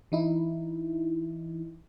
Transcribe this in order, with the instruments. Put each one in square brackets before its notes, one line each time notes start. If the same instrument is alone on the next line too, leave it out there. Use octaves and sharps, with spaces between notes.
[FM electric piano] E3 D#4 E4